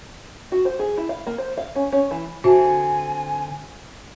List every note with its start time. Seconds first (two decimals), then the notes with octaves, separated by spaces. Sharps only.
0.52 F#4
0.65 C5
0.79 G#4
0.97 E4
1.09 F5
1.27 A#3
1.38 C5
1.58 F5
1.76 C#4
1.92 C#4
2.11 E3
2.44 D3 C4 F#4 C5 E5 G#5 A5